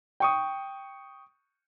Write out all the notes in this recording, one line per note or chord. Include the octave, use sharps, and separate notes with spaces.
G5 C#6 D#6